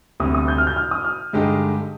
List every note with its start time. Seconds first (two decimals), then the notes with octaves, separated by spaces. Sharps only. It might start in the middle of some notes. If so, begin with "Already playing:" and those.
0.20 D2 C3 G3 D#6
0.34 D#6
0.48 G6
0.58 F6
0.67 G6
0.76 F6
0.91 D#6
1.05 F6
1.33 G2 D3 G#3 D#4 G4